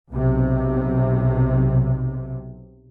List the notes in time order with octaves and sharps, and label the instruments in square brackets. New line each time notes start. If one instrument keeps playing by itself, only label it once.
[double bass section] B1 C3